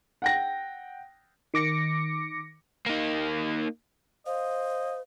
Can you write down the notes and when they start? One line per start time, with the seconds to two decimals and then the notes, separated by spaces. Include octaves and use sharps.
0.22 F#5 G5 A#6
1.54 D#3 D6 A#6 C#7
2.86 A#3 D#4
4.26 C5 D#5 F5